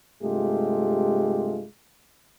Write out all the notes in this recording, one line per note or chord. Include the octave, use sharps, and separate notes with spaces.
G2 C3 G#3 A3 F4 G4